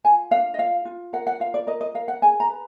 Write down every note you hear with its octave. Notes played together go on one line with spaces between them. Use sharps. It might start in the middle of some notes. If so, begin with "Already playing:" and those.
F4 G#5
D4 F5
D#5
F4 F5
F4
A#4 F#5
F#5
F4 F5
D5
A#4 D#5
D#5
A#4 F5
F#5
G#4 G#5
A#5
B4